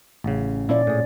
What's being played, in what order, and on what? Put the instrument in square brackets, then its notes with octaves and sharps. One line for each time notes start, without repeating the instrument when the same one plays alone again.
[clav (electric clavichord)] A1 C#3
[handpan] A#2 C#4 D5 [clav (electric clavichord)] F3 E4
[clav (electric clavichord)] A2 G#4